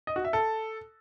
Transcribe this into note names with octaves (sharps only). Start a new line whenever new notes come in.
D#5
F#4
E5
A4